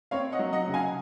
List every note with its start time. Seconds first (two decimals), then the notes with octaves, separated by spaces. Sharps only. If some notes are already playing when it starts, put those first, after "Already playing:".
0.11 C4 C#5 F5
0.32 D#5 F#5
0.39 F#3
0.53 D#5 F#5
0.67 C#3
0.74 F5 G#5